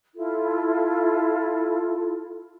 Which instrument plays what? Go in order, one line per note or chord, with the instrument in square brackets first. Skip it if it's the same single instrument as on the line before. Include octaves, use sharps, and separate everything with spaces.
[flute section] E4 F4 A4